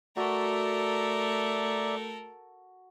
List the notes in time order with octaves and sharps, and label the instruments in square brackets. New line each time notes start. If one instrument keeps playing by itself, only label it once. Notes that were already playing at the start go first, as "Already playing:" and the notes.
[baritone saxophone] A3 [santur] F#4 [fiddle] A4 A#4 [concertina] D5 E5 A#5